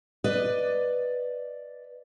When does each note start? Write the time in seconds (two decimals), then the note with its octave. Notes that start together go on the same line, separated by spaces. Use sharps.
0.24 B4 D5 D#5